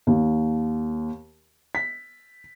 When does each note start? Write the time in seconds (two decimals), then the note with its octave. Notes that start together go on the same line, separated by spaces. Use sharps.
0.07 D#2
1.75 B6